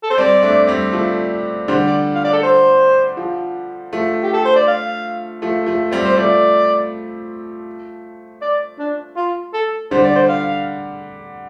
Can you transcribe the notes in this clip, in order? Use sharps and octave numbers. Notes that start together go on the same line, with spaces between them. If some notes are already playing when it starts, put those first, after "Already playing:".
A4
C5
G3 C4 D5
A3 D4
G3 C4
F3 A3
D3 G3 C5
D5
F5
D5
A4
C5
F3
F3 A3
G4
A4
C5
D5
F5
F3 A3
F3 A3
G3 C4
C5
F3 A3 D5
D5
D4
F4
A4
D3 G3 C5
D5
C5
F5